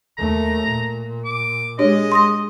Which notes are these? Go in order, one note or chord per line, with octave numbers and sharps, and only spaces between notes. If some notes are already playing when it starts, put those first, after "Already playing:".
D#2 A3 A#5
A#2
D6
G#3 D4 G4 C#5 D#5
C6 D#6 A#6